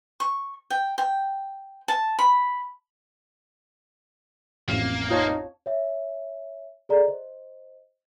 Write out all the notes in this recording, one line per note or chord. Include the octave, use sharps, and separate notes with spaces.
C#6
G5
G5
A5
B5
A1 F2 A#3
D#4 F4 C#5 A5
C#5 E5
G#4 A4 D5 A#5
C5 D#5